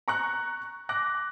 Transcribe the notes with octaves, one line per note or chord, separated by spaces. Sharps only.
A#5 C#6 F#6
D6 F#6 A#6